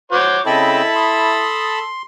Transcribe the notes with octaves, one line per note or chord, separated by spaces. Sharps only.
F#4 C5 C#5 D6
C#3 C4 E4 A4 D#5 G5 A5 B5
C6 D#6